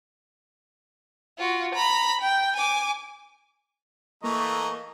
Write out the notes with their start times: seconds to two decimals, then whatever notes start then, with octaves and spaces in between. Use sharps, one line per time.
1.38 F4 F#4
1.75 A#5 B5
2.21 G5
2.56 G#5 D6
4.24 E3 A3 A#3 D#5 A#5 C#6